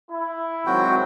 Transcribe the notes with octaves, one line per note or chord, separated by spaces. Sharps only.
E4
G#1 F#3 C4 F#4 G5